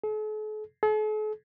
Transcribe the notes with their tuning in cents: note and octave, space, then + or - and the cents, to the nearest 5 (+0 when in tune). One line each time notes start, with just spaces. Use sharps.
A4 -45
A4 -45